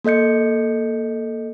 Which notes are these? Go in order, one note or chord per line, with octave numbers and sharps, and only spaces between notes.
A#3 A4 D#5 G6 C#7